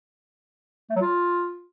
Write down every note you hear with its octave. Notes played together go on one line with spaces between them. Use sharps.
A3
F#3
F4